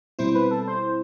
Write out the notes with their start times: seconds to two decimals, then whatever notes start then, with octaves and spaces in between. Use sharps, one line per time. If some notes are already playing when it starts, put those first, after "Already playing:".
0.19 B2 G3 C4 E4 C5
0.35 B4
0.51 A4
0.68 C5